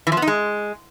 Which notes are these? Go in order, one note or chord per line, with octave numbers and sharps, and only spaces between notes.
E3
F3
B3
D#4
G#3